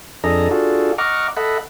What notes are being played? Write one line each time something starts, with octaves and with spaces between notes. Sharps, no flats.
F2 D4 G#4 A4 D#5 A#5
D4 F4 F#4 G#4 A4
D#5 F#5 A#5 C#6 D6 F6
A4 D#5 E5 F#5 B5